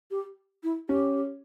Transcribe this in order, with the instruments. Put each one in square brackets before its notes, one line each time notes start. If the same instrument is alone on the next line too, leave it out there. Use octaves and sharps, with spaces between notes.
[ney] G4
E4
[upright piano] C#4 [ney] G4